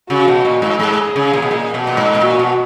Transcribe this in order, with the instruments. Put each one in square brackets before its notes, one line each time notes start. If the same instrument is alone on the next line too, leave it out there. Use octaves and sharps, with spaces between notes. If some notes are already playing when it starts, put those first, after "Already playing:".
[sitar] C#3 [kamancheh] F#4
[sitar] B2
A#2
G#2
[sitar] G#2 [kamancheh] G#4
[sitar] C#3
A#2
B2
A#2
B2
A#2
G#2
B2
[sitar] A#2 [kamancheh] F#4
[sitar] B2